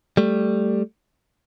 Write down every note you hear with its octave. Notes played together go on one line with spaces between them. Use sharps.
G3 A3